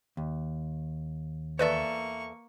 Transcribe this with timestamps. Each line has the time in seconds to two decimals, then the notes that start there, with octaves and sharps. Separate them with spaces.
0.17 D#2
1.59 E2 A#3 A4 B4 D5 E5 C#6